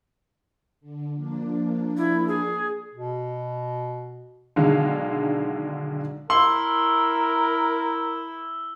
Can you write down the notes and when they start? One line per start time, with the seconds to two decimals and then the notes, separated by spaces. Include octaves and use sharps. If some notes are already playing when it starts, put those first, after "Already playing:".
0.80 D3
1.13 F3 A#3 D4
1.97 E4
2.28 G#4
2.94 B2
4.56 B1 D3 D#3 G#3 F5
6.30 E4 A#4 C6 E6 G7